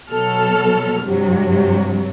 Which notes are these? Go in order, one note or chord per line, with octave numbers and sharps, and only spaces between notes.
B2 F#3 A4 F6
G2 C3 F#3